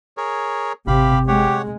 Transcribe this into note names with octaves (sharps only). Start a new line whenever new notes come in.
G#4 A#4 C#5
G#1 C3 G4 F5 B5
G#3 G4 C#5 F#5